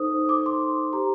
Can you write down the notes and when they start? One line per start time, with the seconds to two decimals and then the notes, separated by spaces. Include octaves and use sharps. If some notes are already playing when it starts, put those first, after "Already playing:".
Already playing: D#4 A4 C5 D#6
0.29 D6
0.46 C6
0.93 G4 C5 A#5